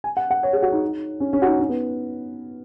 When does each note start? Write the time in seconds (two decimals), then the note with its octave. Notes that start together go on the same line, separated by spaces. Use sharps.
0.04 G#5
0.17 F#5
0.31 F#5
0.43 C#5
0.53 G#4
0.62 F#4
0.72 D#4
1.20 C#4
1.33 C#4
1.42 F#4
1.46 D#4
1.59 C#4
1.69 B3